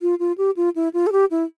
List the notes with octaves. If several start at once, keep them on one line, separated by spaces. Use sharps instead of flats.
F4
F4
G4
F4
E4
F4
A4
G4
E4